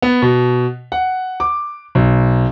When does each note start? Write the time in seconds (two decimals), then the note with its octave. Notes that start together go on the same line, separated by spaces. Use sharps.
0.02 B3
0.22 B2
0.92 F#5
1.40 D6
1.95 B1